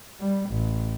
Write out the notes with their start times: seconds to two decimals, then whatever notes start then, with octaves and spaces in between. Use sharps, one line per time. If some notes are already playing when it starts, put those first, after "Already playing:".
0.20 G3
0.49 A1